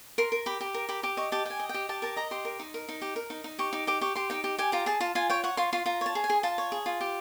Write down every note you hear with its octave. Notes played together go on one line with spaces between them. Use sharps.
A#4 C6
A#4
G4 B5
G4
A#4
G4 B5
G4 D6
D#5 C#6
G4 A5
G4 G5 G#5
D#5
G5
G4
G4 A5
A#4 A5
D#5 A#5
G4 C6
A#4
D#4
A#4
D#4
G4
A#4
D#4
D#4
G4 C#6
D#4 D6
G4 D6
G4 C#6
G4 C6
D#4 G5
G4
G4 G#5
F4 A#5
G#4 A5
F4 A5
F4 G#5
C#5 G5
C#5 F#5
F4 C6
F4 C6
F4 A#5
C#5 A5
G#4
G#5
G#4
F4 A5
C#5
G#4
F4
G4